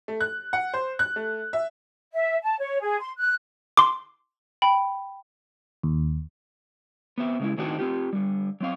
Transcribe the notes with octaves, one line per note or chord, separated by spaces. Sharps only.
A3
F#6
F#5
C5
F#6
A3
E5
E5
A5
C#5
G#4
C6
F#6
C6 D6
G5 B5
D#2
B3 C4 E5
C#3 G#3 E4
A2 D#3 C4 D4 D#4 F#4
C4 F4 G4
D3 G3
F#3 C4 F5